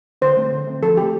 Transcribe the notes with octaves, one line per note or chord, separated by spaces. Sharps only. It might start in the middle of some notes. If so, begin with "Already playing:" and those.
D3 C5
A3 C4
D3
A3 C4
F3 A4
A3 C4 G4